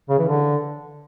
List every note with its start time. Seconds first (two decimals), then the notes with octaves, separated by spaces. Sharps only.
0.09 C#3
0.19 E3
0.28 D3